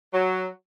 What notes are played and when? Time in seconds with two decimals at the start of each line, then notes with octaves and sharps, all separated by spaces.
0.12 F#3